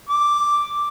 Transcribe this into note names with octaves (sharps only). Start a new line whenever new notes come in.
D6